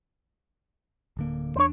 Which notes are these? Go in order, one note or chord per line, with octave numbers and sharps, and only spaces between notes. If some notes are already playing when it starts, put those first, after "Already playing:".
D1 D3 A#3
E2 D4 C5 C#5